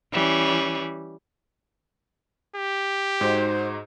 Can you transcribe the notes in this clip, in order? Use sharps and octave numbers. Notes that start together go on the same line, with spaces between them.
E3 G3 C#4
G4
G#2 D#4 F#4 C5